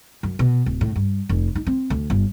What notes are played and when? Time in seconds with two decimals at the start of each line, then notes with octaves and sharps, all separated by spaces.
0.23 F#2
0.39 B2
0.66 D1
0.81 A2
0.96 G2
1.29 F1
1.55 D#4
1.67 C4
1.90 D2
2.10 G1